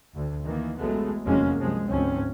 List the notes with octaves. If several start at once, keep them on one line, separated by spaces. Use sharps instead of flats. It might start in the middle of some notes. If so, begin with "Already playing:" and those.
D2
D#3 E3 A#3
A1 F#3 G#3 A3 B3
F1 E2 F#3 G#3 A#3 C#4
C2 F#2 F3 G#3
D2 G#2 F3 C4 C#4